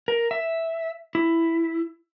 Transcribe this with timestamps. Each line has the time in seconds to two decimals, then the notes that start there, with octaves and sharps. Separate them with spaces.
0.08 A#4
0.31 E5
1.15 E4